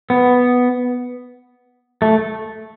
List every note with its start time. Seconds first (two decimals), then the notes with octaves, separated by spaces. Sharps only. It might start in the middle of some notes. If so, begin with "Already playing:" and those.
0.10 B3
2.02 A3